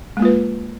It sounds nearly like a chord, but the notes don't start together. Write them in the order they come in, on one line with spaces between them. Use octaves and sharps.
G#3 A#3 F4 B4